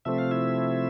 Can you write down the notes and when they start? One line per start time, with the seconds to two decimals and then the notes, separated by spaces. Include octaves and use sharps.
0.05 C3 F3 A3 C4 E5
0.18 F5
0.31 E4 E5